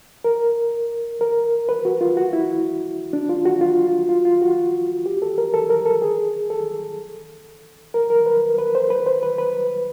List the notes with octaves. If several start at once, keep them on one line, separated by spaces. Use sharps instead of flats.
A#4
A#4
B4
F#4
F4
F#4
E4
D4
F4
F#4
F4
F4
F4
F#4
G4
A4
A#4
A4
A#4
A4
G#4
A4
A#4
A#4
B4
B4
C5
B4
C5
B4
B4